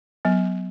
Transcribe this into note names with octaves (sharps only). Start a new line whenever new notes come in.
F#3 B3